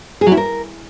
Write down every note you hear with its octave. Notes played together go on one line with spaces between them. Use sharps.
G#4
F#3
E4
A#4